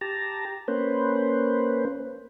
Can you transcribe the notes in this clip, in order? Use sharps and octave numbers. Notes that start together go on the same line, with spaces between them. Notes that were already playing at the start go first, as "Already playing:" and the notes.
G4 A5 A#5
A#3 C#4 B4 C5